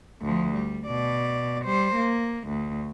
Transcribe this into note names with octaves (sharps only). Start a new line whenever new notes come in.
D2 F3
G3
B2 D5
G3 C5
A#3
D2